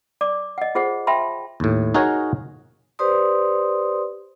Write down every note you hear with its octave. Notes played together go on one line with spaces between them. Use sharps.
D5 D6
D#5 F#5
F4 G#4 C5 F#5
E5 G5 A5 B5 C6
D#2 A2
D#4 F#4 G#4 A#4 C#5
G4 B4 C5 D5 C6 D#6